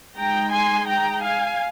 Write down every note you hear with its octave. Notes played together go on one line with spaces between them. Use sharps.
G#3 D#4 G5 A#5
G#5 C6
G5 A#5
F5 G#5